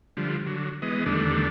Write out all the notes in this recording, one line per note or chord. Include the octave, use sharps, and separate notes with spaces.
D3 F3 G3
D3 F#3
E3 G#3 B3 D#5
E2 D3 D#3 G3 A3 D4